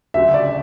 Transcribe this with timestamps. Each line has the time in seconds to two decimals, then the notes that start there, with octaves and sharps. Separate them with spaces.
0.14 D2 C#3 F#3 C#4 G4 E5
0.34 D5